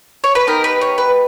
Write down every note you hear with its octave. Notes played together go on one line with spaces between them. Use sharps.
C#5
B4
B3 D#4 G4 A#4
B4
C#5
B4